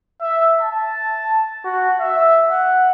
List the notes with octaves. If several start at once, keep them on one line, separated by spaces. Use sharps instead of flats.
E5
A5
F#4
E5
F#5